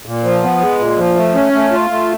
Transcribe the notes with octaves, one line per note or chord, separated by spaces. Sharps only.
A#2
F3
B3
G#3
A#2
F3
A3
C#4
A3
F4
A3